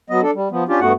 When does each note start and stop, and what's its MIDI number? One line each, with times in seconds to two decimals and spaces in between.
0.10 0.21 54
0.10 0.21 59
0.10 0.21 75
0.22 0.31 62
0.22 0.31 69
0.34 0.48 55
0.52 0.64 53
0.52 0.64 59
0.69 0.80 61
0.69 0.80 62
0.69 0.80 65
0.69 0.80 67
0.81 0.92 43
0.81 0.92 57
0.81 0.92 59
0.81 0.92 66
0.81 0.92 78